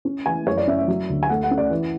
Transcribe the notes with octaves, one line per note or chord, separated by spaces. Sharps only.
C#4
E3 G#5
F#2 C#5
D5
C#4 E5
E5
F#3
D2
G#5
A3 F#5
F#5
C#4
D5
E3